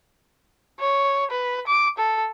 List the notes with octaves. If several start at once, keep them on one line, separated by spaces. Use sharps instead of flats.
C#5
B4
D6
A4